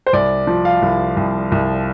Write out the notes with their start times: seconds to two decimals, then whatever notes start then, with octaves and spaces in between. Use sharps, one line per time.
0.07 C5
0.13 C2 D5
0.47 F3
0.65 F5
0.82 C2
1.17 C2
1.52 C2